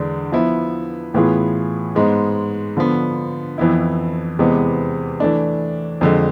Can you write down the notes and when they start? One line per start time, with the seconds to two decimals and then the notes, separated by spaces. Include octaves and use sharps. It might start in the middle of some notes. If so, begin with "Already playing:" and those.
Already playing: E2 D3 G#3 D4
0.32 F3 B3 E4
1.14 A2 E3 B3 F4 G#4
1.95 G#2 G#3 B3
2.77 D3 F3 B3
3.58 F2 E3 B3 E4
4.39 E2 C3 G#3 B3
5.20 E3 A3 D4
6.01 F2 D3 G#3